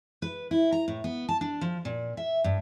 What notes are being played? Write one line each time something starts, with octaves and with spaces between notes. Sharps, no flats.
B4
E4
A#5
A2
B3
A5
D4
F3
A#2
E5
G2